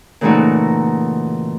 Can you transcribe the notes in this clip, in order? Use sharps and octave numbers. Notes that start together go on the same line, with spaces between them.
A#2 C#3 E3 A3 D#4 F#4